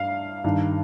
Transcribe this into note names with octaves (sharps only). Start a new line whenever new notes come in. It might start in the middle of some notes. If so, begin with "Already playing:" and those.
Already playing: G2 F5
G2 D#3